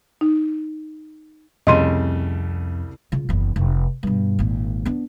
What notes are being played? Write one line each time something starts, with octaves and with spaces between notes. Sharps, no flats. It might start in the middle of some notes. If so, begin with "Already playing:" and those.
D#4
C2 F2 C#3 G3 A3 D#5 C6 D#7
C#3 F4
F#1 E2
F1
G2 B2
G#1 A#2
B3 D4